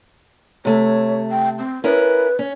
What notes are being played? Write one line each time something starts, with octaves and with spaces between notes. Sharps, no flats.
C3 A3 C#5
G5
C4
C#4 E4 A#4 B4
C#4